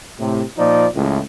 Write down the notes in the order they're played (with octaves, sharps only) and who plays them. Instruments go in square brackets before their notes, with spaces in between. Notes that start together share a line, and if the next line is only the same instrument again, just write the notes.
[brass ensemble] A2 C3
A#2 F3 D#4 D5
C#2 A2